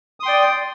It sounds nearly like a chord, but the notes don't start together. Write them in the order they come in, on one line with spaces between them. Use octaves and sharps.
D#6 C6 G5 D5